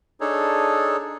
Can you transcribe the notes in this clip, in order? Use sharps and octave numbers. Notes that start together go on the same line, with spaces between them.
D4 D#4 G#4 A4 C#5